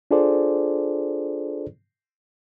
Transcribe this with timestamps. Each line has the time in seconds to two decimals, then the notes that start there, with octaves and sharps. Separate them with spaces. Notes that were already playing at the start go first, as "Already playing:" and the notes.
0.11 D4 F4 G#4 A4 C5 D5